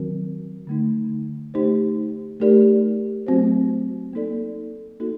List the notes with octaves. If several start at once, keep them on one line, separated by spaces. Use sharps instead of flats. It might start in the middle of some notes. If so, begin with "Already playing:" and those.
Already playing: D#3 F#3 C4 F#4 A#4
D3 A3 D#4
A3 D#4 G4 C5
A3 D#4 G4 A#4 D5
F#3 A3 C4 F#4 C5
A#3 D#4 A4 D5
A#3 D#4 F#4 A4